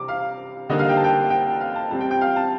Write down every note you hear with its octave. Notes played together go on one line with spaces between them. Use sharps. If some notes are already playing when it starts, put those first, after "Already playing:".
Already playing: C3 G3 D4 D6
F5
D3 G3 A#3 D#4 D#5
F5
G5
A5
G5
G5
F5
A5
A#2 G3 C4 A5
G5
G5
F5
A5